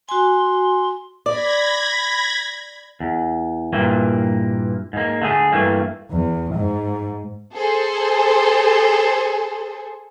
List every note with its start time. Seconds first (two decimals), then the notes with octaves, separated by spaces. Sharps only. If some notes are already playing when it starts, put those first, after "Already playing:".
0.09 F#4 G#5 C6
1.26 D5 B5 G#6 A#6
3.00 E2
3.73 G2 A#2 E3 A#3
4.93 G#2 A#3
5.22 D3 A3 G#4
5.53 G2 E3 A3 A#3
6.11 E2
6.54 G#2
7.54 G#4 A4 C5